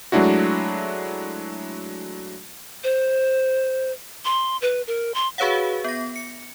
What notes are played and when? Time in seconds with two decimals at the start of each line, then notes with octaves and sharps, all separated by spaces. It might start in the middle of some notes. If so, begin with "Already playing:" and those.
0.12 F#3 G#3 A3 D4 E4 F#4
2.84 C5
4.25 C6
4.62 B4
4.87 A#4
5.14 C6
5.38 F#4 G#4 B4 C#5 F5 F#5
5.84 B3 A#6
6.16 C#7